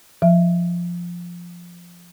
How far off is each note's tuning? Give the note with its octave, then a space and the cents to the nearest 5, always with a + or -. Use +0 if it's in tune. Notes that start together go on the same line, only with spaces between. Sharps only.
F3 +0 E5 +25